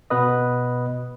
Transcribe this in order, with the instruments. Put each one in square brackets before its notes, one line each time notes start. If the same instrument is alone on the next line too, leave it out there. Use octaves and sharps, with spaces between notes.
[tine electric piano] B2 B3 B4 D#5